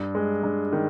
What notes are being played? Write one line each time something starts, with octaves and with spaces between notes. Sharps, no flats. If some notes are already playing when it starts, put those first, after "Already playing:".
Already playing: G2
G#3
G2
D#3